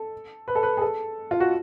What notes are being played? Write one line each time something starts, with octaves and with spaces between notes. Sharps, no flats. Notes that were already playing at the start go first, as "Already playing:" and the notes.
Already playing: A4
B4
A4
B4
G#4
A4
F4
F#4